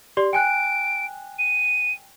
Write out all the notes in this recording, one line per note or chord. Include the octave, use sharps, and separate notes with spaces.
G4 D5 C6
G5 G#5 F#6 D7
D#7